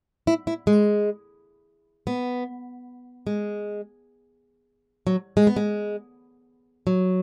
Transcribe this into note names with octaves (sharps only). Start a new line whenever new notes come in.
E4
E4
G#3
B3
G#3
F#3
G#3
B3
G#3
F#3